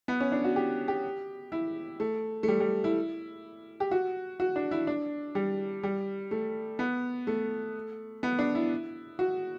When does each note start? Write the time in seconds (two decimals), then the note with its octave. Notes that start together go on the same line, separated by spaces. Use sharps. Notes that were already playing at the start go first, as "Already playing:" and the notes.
0.08 B3
0.20 C#4
0.32 D4
0.44 F#4
0.56 G4
0.88 G4
1.52 E4
2.00 A3
2.43 A3
2.48 G3
2.60 G3
2.84 E4
3.80 G4
3.91 F#4
4.40 F#4
4.56 D4
4.71 E4
4.87 D4
5.35 G3
5.83 G3
6.31 A3
6.79 B3
7.27 A3
8.23 B3
8.39 D4
8.55 E4
9.19 F#4